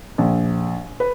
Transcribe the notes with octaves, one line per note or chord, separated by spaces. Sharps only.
A#1
B4